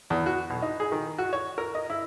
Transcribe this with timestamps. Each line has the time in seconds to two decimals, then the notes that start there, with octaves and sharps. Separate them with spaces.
0.10 E2
0.26 F#4
0.50 B1
0.62 D#4
0.80 G#4
0.92 D#3
1.18 F#4
1.33 C#5
1.58 A#4
1.75 D#5
1.90 E4